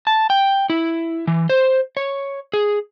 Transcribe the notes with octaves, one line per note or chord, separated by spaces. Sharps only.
A5
G5
E4
E3
C5
C#5
G#4